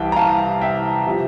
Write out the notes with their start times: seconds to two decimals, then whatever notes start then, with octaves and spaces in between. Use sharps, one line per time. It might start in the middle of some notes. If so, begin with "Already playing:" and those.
Already playing: C2 C3 E3 G5 A5
0.12 A#5
0.16 F5 A5
0.61 E5 G5
1.06 C3 F3